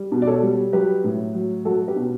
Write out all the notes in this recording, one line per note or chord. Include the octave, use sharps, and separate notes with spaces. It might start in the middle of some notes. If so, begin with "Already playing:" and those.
Already playing: G3
B2
D5
A4 C#5
G3
F#3 G4 B4
A2
F#3
F#3 F#4 A4
G4 B4
B2